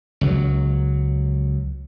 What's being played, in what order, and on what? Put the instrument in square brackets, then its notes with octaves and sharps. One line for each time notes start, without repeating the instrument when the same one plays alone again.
[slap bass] C#2 F#3